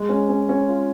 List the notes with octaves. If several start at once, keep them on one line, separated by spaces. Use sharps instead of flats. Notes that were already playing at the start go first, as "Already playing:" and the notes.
Already playing: G#3
C#4
C#4
C#4
F4